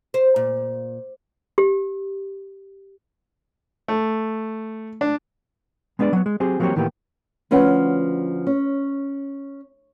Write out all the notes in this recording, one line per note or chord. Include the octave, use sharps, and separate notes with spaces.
C5
A#2
G4
A3
D4
G#3 B3 D4 B4 D5
F#3 B3
G#3
F#3 C4 G4 G#4
F3 F#3 A#3 C4 G4 C#5
A2 D#3 E3 A#3 B3 G4
D2 F3 C#4 B4 F#5
C#4